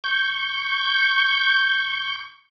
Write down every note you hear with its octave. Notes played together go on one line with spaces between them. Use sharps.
C#6 G6